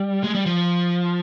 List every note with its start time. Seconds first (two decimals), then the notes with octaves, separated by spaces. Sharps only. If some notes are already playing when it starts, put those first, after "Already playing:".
Already playing: G3
0.24 G#3
0.35 G3
0.46 F3